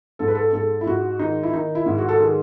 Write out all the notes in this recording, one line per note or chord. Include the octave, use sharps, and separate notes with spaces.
G#2 A4
B4
A4
G#2 A4
E4
G#2 F#4
D#3 D#4
E4
D#3 D#4
E4
G#2
F#4
A4
D#3 G#4